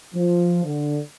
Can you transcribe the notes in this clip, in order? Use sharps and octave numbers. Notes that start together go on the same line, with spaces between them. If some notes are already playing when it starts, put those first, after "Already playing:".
F3
D3